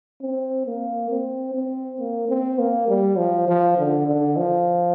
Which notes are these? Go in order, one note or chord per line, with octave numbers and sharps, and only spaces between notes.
C4
A#3
C4
C4
A#3
C4
A#3
G3
F3
F3
D3
D3
F3